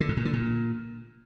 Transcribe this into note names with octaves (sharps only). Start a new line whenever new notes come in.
D3
G#2
A#2
D3
A#2